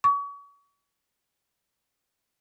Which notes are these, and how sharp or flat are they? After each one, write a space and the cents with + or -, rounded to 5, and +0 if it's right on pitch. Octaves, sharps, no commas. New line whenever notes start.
C#6 +35